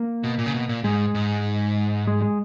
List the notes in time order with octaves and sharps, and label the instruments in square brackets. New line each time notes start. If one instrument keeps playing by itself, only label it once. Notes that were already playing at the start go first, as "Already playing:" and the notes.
Already playing: [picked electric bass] A#3
[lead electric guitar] B2
A#2
C#3
B2
A#2
[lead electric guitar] G#2 [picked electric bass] G#3
[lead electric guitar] G#2
[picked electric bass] G#3
G#3